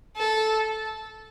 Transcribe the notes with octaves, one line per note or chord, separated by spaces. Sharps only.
A4